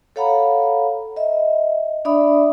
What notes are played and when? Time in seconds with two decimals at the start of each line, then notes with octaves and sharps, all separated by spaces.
0.16 A4 C#5 F5 F#5 A#5 B5
1.16 D#5 E5
2.05 D4 D5 E5 B5 D#6